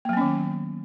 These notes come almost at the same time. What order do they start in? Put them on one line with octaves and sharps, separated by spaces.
A#3 F#3 B3 C#4 D#3